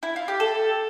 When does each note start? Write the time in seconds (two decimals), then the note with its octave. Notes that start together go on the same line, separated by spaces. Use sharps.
0.03 E4
0.16 F4
0.28 G4
0.40 A4